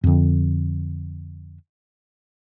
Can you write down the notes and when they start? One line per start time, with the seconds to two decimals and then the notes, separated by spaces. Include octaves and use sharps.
0.04 F2 D3